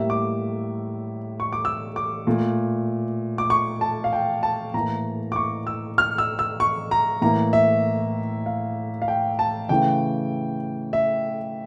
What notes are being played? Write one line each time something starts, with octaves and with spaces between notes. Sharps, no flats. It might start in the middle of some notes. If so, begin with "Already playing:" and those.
Already playing: A2 G3 A#3 E5
D6
C#6
D6
E6
D6
A#2 A3
D6
C#6
A5
F5
G5
A5
A2 E3 A#3 A#5
D6
C#6
E6
F6
E6
E6
C#6
A#5
A2 E3 A#3 A#5
E5
F5
F5
G5
A5
C#3 E3 A3 G5
E5